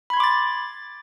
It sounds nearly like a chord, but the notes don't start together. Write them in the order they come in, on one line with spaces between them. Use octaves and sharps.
B5 G#6 C6 D6 A6